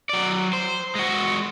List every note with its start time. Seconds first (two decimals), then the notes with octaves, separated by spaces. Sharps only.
0.09 F#3 D5
0.53 C5
0.95 G#3 F#4